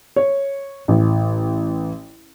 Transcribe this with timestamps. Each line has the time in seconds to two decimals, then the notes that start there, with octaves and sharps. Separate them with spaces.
0.16 C#5
0.88 A1